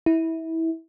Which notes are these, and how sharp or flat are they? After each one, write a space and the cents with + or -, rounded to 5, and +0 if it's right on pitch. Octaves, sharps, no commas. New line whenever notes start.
E4 -20